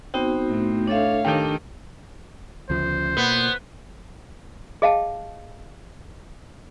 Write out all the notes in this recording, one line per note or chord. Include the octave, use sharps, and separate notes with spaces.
B3 C4 D#4 F#4
A2
D4 A4 C#5 E5 F5
D#3 D4 G4 A4 G5
D2 C#3 F3 C5
B2 A#3 B3
G#4 D#5 F5 G5 A5